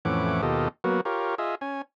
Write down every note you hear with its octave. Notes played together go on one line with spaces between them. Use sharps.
F2 A2 E3 C#4 F#5 D6
D#2 B2 F4 G4 A4 D#5
F#3 A#3 B3 F#4
F4 G4 A#4 C#5
F4 G#4 D#5 E5
C#4 G#5